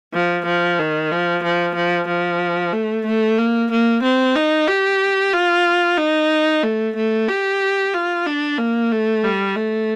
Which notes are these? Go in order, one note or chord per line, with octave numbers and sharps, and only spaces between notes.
F3
F3
D#3
F3
F3
F3
F3
A3
A3
A#3
A#3
C4
D#4
G4
F4
D#4
A3
A3
G4
F4
D4
A#3
A3
G3
A3